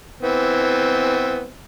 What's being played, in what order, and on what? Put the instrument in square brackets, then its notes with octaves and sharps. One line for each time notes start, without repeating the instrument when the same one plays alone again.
[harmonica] E3 B3 C4